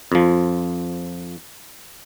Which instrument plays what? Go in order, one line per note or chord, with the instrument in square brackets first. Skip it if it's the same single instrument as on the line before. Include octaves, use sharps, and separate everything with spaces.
[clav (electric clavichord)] F2 F3